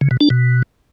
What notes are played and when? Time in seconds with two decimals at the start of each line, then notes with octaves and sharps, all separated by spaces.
0.01 C#3
0.11 B2
0.21 D4
0.30 B2